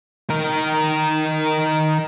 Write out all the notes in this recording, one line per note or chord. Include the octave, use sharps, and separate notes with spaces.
D#3 A#4